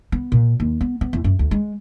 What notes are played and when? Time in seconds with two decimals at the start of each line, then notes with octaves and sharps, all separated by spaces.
0.12 B3
0.32 A#2
0.60 D#2
0.81 B3
1.01 B3
1.13 E2
1.24 F#2
1.39 D2
1.51 G#3